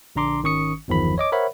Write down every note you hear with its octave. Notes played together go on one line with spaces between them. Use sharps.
A#1 D3 D4 A#5 C6 D6
G#1 D#3 C#4 C#6 D#6 C#7
G1 E2 D#3 F3 B5
C#5 D#5 D6
A#4 C5 C#5 E5 F#5 B5